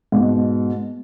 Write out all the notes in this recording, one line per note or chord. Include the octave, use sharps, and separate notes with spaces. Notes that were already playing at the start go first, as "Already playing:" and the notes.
G#2 B2